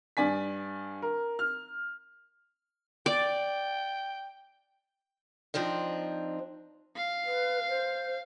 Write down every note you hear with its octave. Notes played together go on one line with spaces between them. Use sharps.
G2 D5 G#5 B6
A#4
F6
D5 G5
F3 C4 D4 D#4
F5
B4
C5